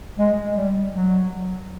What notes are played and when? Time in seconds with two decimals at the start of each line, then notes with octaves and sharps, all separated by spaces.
0.18 G#3
0.56 G3
0.93 F#3